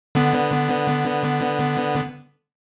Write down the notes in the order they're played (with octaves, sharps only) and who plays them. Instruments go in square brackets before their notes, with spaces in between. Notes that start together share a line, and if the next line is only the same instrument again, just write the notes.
[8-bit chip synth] D3 B3